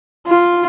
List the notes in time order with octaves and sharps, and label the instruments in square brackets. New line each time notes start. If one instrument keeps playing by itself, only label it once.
[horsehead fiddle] F4